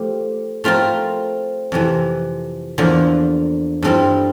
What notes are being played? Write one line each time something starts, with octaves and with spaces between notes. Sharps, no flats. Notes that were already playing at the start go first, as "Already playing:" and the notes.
Already playing: F3 A3 G4
F3 A3 C4 F4 A#4
F2 C3 E3
E2 D3 F3 A#3
G2 F3 C4 E4 A4